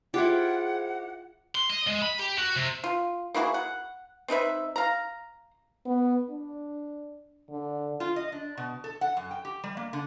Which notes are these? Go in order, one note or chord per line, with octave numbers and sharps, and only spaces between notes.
E4 F4 G4 G#4 C5 F#5
C6
D#5
G#3
B5
G4
F#4
C3
F4
A#3 E4 F#4 G#4
F#5
C4 D#4 B4 E5
F5 A#5
B3
D4
D3
F4
D#5
D4
B2
A4
F#5
F#2
G5
G4
G3
A#3
D3